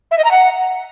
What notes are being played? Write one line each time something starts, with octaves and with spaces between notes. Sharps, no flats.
E5
D#5
A#5
F#5